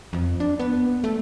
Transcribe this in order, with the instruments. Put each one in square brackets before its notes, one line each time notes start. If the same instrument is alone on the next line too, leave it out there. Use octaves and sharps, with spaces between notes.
[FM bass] F2
D4
B3
A3